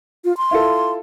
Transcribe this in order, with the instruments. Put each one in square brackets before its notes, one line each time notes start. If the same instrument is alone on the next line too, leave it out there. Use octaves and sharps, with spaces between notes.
[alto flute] F4
C6
[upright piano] E4 F4 A4